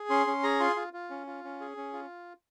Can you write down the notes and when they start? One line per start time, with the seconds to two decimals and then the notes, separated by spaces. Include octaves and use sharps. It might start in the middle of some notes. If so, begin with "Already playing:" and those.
Already playing: G#4
0.09 C#4 C6
0.27 C#4
0.43 G#4 A#5
0.60 F4 C6
0.76 F4
0.93 F4
1.10 C#4
1.27 F4
1.44 C#4
1.60 G#4
1.77 C#4
1.93 F4